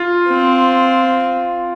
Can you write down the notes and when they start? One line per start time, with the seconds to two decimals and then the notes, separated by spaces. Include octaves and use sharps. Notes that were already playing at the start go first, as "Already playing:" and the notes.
Already playing: F4
0.28 C4